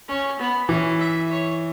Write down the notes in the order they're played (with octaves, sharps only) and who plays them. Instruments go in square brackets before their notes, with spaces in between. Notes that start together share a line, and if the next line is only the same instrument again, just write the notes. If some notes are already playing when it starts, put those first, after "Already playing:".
[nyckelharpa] C#4
B3
[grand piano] E3 [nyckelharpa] C#4
[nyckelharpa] E5
C#5